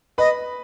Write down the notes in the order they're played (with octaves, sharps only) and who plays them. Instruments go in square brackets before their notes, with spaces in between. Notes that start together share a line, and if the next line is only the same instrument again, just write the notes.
[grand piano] B4 B5 [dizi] D#5